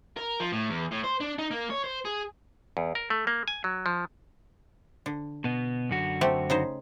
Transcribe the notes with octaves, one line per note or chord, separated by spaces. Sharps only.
A#4
F3
A2
E2
A2
C5
D4
D#4
A#3
C#5
C5
G#4
E2
A#4
A3
A#3
G#5
F#3
F3
D3
B2 B3
F#2 D3 F#4
A3 C4 G4
C#3 D#4 C5